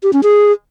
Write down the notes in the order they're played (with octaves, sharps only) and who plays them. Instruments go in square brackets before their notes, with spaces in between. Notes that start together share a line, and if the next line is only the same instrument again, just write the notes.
[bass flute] G4
C#4
G#4